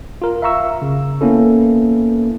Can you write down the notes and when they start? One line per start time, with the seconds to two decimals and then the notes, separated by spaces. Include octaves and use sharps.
0.22 F4 A#4
0.42 E5 F5 A#5 C#6 E6
0.82 C#3
1.21 A#3 B3 C#4 E4 A4